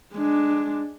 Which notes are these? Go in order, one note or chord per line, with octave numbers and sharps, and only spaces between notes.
G#3 D4